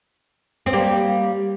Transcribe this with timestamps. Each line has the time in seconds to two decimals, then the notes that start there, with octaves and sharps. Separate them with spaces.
0.66 C4
0.73 G3 A#3